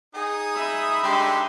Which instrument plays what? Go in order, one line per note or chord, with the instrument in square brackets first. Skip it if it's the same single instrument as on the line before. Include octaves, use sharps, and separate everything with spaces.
[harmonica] D#4 D#6 [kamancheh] G#4
[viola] E5 B5
[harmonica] D3 G#3 D#4 [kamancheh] G4 C6